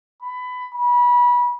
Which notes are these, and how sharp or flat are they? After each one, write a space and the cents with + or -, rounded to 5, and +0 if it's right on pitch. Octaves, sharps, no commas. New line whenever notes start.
B5 +20
B5 -25